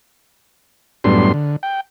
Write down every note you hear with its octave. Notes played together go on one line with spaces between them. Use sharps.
F#2 A2 G3 B3 D4 C6
D3
G5